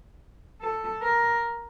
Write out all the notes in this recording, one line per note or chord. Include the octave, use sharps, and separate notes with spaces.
A4
A#4